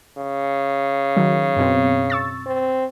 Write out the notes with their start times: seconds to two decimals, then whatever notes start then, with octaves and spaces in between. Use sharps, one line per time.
0.18 C#3
1.17 D#3 F#3
1.56 F#2 B2 C4
2.10 C#6 E6 A6
2.46 C4